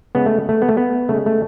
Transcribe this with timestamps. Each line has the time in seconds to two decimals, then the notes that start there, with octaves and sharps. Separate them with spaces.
0.15 C#3 G#3 B3
0.26 A3
0.49 A3
0.62 B3
0.69 A3
0.77 B3
1.09 C#3 A3
1.14 G#3
1.26 A3